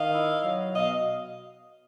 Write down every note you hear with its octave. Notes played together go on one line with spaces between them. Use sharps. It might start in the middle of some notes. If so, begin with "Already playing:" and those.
Already playing: D#3 D#5 F5
E4
F#3
B2 D#5 F5